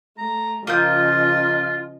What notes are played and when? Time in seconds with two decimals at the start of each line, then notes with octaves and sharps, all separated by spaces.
0.18 A3 A#5
0.67 C#3 F3 A#3 F4 D#5 F5 D#6 G6